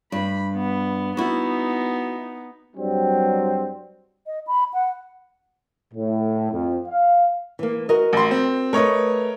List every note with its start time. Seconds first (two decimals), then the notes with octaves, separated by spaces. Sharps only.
0.12 G2 B5
0.55 B3
1.17 B3 D#4 E4 F#4
2.76 G2 F#3 G3 C4
4.26 D#5
4.47 B5
4.73 F#5
5.94 A2
6.52 F2
6.88 F5
7.59 E3 A#3
7.89 F#4 A#4 D#5
8.13 A1 C6
8.31 C4
8.73 A3 A#4 B4 C#5 D#5